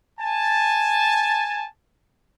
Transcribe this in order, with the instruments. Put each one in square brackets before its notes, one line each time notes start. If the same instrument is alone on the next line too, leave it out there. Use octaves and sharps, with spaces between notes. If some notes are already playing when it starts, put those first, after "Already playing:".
[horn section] G#5 A5